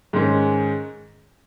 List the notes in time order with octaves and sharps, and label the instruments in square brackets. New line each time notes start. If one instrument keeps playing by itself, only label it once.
[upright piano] G#2 D#3 G#3 C#4